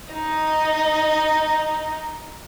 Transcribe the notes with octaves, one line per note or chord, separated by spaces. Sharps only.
D#4 D#5